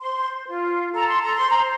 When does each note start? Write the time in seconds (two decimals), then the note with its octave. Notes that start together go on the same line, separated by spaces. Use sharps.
0.01 C5 C6
0.47 F4
0.94 A4 A#5
1.08 C6
1.21 A#5
1.35 C5 C6
1.49 A#5